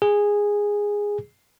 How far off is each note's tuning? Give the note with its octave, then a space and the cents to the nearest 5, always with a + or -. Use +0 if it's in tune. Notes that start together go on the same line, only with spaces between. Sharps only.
G#4 -10